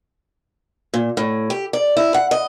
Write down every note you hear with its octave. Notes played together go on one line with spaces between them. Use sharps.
A#2
A2
G4
D5
E4
F#5
D#5